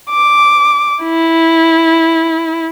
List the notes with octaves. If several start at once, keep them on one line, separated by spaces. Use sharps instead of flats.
D6
E4